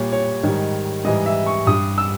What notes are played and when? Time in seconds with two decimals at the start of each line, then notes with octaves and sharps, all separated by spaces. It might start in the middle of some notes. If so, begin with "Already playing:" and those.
Already playing: A#2 G3 C#5
0.12 C#5
0.43 G#2 D#3 G3
1.04 G#2 E3 G3 D#5
1.26 E5
1.46 C#6
1.67 G2 G3 D#6
1.98 E6